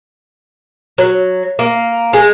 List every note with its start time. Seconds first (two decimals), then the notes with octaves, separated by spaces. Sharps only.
0.98 F#3
1.59 A#3
2.13 G#3